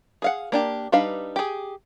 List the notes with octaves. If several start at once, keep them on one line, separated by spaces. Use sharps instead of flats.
G#4 F5 F#5
A#3 D4 G4
G3 D4 D#4 B4 F5
G4 G#4